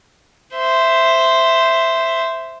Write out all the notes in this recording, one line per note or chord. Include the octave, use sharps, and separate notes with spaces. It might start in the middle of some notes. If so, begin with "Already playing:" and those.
C5 E5